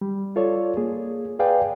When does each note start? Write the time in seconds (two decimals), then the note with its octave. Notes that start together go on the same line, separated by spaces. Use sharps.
0.01 G3
0.36 F4 A4 C#5 D5
0.77 A#3 G#4
1.39 G#4 B4 D5 F5 G5 G#5